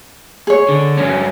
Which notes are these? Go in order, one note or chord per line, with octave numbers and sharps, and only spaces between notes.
G#4 C#5
D3
G2 C#4